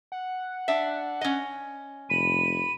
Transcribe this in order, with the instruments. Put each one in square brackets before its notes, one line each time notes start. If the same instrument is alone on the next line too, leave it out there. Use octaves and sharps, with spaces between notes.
[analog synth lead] F#5
[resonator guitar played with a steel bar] D4 E5
C#4 D#5
[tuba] F1 [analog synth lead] B5 [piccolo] D#7